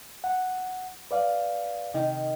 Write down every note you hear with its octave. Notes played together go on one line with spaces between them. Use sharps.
F#5
B4 D5 F5
C3 D#3